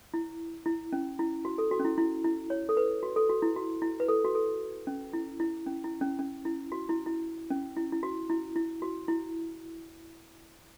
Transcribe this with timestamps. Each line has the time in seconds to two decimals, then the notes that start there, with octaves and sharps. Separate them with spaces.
0.14 E4
0.66 E4
0.93 C#4
1.19 E4
1.45 F#4
1.58 A4
1.71 F#4
1.80 C#4
1.85 E4
1.98 E4
2.24 E4
2.50 C#5
2.69 A4
2.77 B4
3.03 F#4
3.16 A4
3.29 F#4
3.42 E4
3.56 F#4
3.82 E4
4.00 B4
4.08 A4
4.25 F#4
4.35 A4
4.87 C#4
5.13 E4
5.40 E4
5.66 C#4
5.84 E4
6.01 C#4
6.19 C#4
6.45 E4
6.72 F#4
6.89 E4
7.06 E4
7.50 C#4
7.77 E4
7.92 E4
8.03 F#4
8.30 E4
8.56 E4
8.82 F#4
9.08 E4